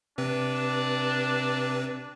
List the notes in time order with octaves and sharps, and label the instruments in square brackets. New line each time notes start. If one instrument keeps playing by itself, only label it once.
[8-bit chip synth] C3 C4 B4 [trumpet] D4